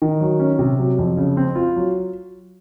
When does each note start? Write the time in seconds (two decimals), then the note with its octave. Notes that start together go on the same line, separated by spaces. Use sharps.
0.02 D#3
0.20 F#3
0.39 C#4
0.59 C3
0.79 F#3
0.98 F2
1.17 C#3
1.37 C4
1.55 F4
1.76 F#3